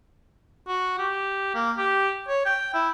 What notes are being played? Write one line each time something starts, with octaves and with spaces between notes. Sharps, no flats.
F#4
G4
A#3
G4
C#5
G5
E4